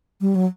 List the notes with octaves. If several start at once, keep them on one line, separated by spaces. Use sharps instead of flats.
G3
F#3